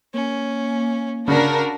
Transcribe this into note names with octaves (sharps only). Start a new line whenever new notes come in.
A#3 C#4
C#3 D4 F#4 A#4